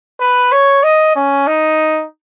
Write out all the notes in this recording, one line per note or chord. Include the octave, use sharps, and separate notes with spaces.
B4
C#5
D#5
C#4
D#4